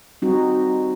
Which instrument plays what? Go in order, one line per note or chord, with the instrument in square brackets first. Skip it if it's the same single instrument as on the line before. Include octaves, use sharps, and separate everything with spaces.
[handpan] G3 C4 D#4 F#4